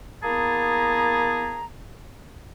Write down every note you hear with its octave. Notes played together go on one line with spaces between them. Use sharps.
A#3 B3 E4 G#4 A5 A#5